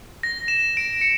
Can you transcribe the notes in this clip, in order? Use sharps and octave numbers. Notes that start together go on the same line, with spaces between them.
A#6
E7
D7
C#7